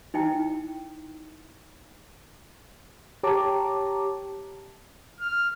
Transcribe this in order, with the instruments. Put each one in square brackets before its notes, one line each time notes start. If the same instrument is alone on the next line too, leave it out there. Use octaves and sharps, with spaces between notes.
[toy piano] D#4 E4 G5
[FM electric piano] G4 C#5 A5 A#5 D6
[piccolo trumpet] F6